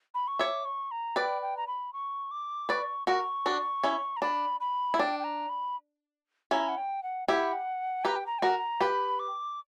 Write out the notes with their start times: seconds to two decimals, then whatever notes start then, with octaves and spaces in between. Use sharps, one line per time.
0.14 B5
0.28 C#6
0.39 C#5 E5 D6
0.65 C#6
0.91 A#5
1.16 B4 D5 G5
1.42 G5
1.57 A#5
1.67 B5
1.93 C#6
2.31 D6
2.69 B4 D5 C#6
3.07 F#4 A#4 C#6
3.46 D4 F#4
3.84 C#4 E4
4.16 A#5
4.22 D4 B5
4.60 B5
4.94 E4
4.99 D4 G5
5.20 G5
5.24 A#5
5.49 B5
6.51 C#4 E4 A#5
6.68 F#5
6.77 G5
7.03 F#5
7.28 E4 G4 F#5
8.04 G4 B4 A#5
8.16 G5
8.26 A#5
8.39 G5
8.42 F#4 A#4 A#5
8.81 G4 B4 B5
9.19 D6